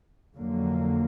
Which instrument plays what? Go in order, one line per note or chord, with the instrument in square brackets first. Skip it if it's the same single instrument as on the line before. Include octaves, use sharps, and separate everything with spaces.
[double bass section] F2 D3 F#3 A#3